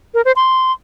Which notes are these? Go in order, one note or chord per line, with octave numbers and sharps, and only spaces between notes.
A#4
C5
C6